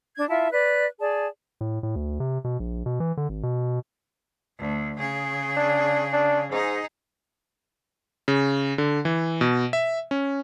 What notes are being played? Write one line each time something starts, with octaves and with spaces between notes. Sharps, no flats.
D4 G#6
E4 F4 E5 A5
B4 D5 F#6
G#4 D5 A5
A2
A2
D2
C3
B2
A#1
B2
E3
D3
G#1
B2
D2
C#3 G#4
D4
D4
G#2 D#4 G#4
C#3
D3
E3
B2
E5
C#4